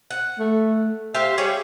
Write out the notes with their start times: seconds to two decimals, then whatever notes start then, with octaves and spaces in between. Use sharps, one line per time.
0.10 F#5
0.39 A3
1.14 G4 C5 E5 F5
1.38 G3 G4 G#4 C#5